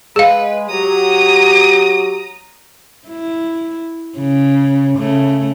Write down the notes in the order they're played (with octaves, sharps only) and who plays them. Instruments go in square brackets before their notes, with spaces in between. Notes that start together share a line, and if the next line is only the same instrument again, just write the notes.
[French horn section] G#3 [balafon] G#4 F5 [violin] B4
[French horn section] F#3 G4 [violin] A#5 D#6
[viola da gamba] E4
C#3
C#3 A3